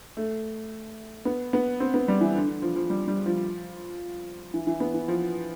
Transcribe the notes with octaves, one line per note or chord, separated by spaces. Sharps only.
A3
B3
B3
C4
B3
G3
E3
D3
D3
F3
F3
G3
G3
F3
E3
E3
B3
E3
F3